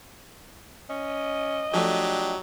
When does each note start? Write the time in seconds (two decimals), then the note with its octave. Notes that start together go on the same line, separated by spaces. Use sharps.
0.90 C#4 D#5
1.74 F3 F#3 A3 D4 G4